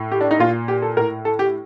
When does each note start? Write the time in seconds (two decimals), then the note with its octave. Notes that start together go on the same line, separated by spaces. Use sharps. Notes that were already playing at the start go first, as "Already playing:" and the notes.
Already playing: A2
0.12 G4
0.21 D4
0.31 D#4
0.39 A#2 F4
0.68 G4
0.82 A4
0.97 A2 A#4
1.25 A4
1.39 G4